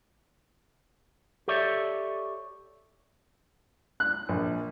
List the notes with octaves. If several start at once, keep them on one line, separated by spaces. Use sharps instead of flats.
G4 A4 C#5 D5 E5
F#6
A#1